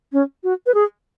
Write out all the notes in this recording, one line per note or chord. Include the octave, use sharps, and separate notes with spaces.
C#4
F#4
B4
G#4